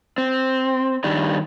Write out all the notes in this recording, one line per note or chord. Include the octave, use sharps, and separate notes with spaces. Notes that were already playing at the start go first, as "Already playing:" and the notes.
C4
G2 D#3 G3 D4